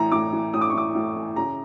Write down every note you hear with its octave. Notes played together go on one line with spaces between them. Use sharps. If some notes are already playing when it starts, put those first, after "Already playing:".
Already playing: A2 E3 A#5
A2 D6
E3
A2 D#6
D6
C#6
E3 D6
A2
E3
C#3 A#5